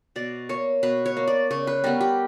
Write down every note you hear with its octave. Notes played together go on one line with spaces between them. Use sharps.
B2 D5
A#3 C#5
B2 B4
C#5
A#3
D5
C#3 C#5
B4
G3 B3 A#4
G4